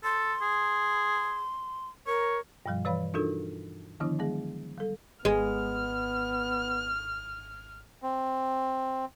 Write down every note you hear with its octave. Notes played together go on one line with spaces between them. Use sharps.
A4 C6
G#4
A#4 C#5
G2 B2 F3 G3
E3 B4 C#5 F5 B5
D4 D#4 F4 F#4 A4 A#4
D3 D#3 F3 B3 D4 E4
F#3 G#3 B3 G#4
G3 A4
G#1 G#3 B3 F6
C4